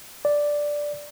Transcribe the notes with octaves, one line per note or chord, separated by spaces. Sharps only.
D5